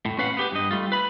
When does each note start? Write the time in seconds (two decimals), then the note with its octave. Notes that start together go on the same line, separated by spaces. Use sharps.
0.05 A2
0.19 C#4 B4 F5 F#5
0.37 B3 G4 B4
0.52 G2 D#5
0.71 G3 A3 F4
0.92 B4 B5